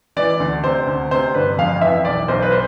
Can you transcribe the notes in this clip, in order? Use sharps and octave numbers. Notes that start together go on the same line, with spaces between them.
E3 D5
D2
C3 C5
D2
C3 C5
G1 B4
F2 F5
E3 E5
B1 D5
B1 C5
B4
C5